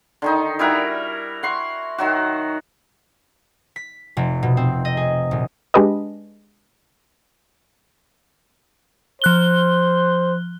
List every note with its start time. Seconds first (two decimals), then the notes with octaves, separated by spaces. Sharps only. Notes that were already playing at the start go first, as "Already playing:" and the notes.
0.22 D3 D#3 D#4
0.59 G3 E4 F#4 A#4
1.43 F#5 C6 C#6
1.98 D#3 F#3 F#4
3.76 B6
4.17 F1
4.43 B2
4.57 C4
4.85 D#5
4.97 G#4
5.31 D#1
5.74 G#3 D4 G4 B4 D#5
9.22 F3 C5 F#6 G7